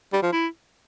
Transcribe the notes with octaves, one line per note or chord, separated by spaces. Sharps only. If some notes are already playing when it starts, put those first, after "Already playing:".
G3
F3
E4